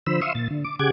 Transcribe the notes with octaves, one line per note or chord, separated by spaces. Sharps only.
D3 F3 C5 B5 E6
E5 F5 C6 C#6 D#6 E6
A#2 A6
D3
D6
C#3 G4 G#4 F#5 D6 G#6